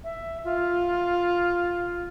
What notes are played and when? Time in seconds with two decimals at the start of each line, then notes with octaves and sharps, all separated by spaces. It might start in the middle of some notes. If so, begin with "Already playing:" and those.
0.04 E5
0.44 F4